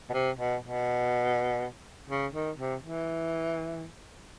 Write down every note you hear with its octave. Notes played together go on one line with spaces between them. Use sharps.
B2
C3
B2
B2
C#3
D#3
C3
E3